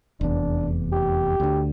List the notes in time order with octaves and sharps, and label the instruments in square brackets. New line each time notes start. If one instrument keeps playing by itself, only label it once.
[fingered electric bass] F1 E2 [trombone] D4
[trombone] G4
[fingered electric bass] D2 D3